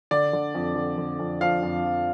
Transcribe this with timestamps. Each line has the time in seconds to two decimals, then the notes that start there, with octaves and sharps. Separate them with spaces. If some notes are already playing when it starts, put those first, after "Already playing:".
0.11 D3 D5
0.33 D3
0.55 F2
0.76 D3
0.98 D3
1.19 F2
1.41 F3 F5
1.63 F2
1.84 F3